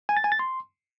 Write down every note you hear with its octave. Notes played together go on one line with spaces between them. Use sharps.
G#5
A6
G#5
A6
C6